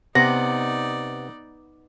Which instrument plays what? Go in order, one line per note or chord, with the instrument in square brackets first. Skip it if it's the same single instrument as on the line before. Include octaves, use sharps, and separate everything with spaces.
[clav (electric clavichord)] C3 [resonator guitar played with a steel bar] B3 [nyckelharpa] D#4 D5 [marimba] A#6